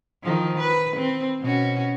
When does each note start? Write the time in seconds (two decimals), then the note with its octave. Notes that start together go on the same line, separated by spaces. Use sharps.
0.23 D#3 F3
0.59 B4
0.96 C4
1.41 B2 C#4 F#4